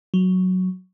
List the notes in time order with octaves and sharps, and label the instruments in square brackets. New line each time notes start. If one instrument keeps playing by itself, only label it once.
[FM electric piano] F#3